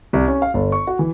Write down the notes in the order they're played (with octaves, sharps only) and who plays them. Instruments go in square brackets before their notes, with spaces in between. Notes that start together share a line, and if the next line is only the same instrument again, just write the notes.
[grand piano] C2
C#4
F5
G1
C#6
F#4
E3